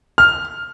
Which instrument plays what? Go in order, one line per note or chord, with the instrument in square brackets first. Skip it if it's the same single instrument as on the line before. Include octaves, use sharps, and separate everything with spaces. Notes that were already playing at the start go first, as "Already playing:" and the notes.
[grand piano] F6